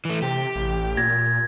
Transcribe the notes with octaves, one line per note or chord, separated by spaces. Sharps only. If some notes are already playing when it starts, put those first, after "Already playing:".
E3 A3
C3 G4
A1
A#2 G#6 A#6